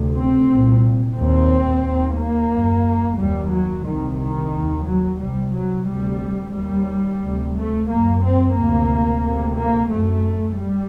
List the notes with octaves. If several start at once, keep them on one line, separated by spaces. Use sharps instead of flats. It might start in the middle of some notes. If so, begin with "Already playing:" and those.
Already playing: D2 C3
C4
C2 A#2
D#2 C4
D#2
A#3
F#2
D#2 G3
F#3
C2 C3 D#3
D#3
D#2
F#3
C2 C3 G3
F#3
D2 C3 G3
D#2 G3
D2 C3
A3
F#2 A#3
C4
D2 C3 A#3
D2 C3
A#3
F#2 A3
G3